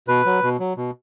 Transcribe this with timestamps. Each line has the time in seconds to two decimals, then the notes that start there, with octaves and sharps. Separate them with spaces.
0.08 B2 B4
0.26 F#3
0.43 B2
0.60 F#3
0.77 B2